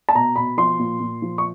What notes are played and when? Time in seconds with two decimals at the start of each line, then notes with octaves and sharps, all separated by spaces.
0.09 A5
0.15 B2 A#5
0.36 B2 B5
0.57 F3 C6
0.79 A#2
1.00 A#2
1.22 F3
1.38 C#6